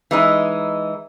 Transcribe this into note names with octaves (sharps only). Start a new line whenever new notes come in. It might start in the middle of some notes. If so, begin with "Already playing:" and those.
E3 G#3 D#4